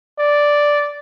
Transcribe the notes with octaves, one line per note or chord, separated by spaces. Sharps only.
D5